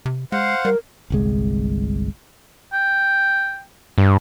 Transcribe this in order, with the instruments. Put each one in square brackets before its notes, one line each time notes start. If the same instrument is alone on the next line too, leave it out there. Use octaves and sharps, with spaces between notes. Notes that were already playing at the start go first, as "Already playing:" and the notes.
[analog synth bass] C3
[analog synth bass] G#3 [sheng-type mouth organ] C5 F5 F#5
[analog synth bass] G3 [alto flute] A#4
[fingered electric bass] G1 C2 G#3
[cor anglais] G5
[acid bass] G2